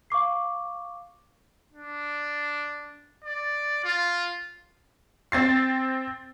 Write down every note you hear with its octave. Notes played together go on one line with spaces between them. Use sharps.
F5 C#6 D6 C7
D4
D5
F4
C4 A6 C7